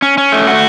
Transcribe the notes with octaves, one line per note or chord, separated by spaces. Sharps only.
C#4
C#4
A3
F#4